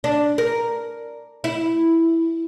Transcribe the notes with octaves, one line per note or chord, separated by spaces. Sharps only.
D4
A#4
E4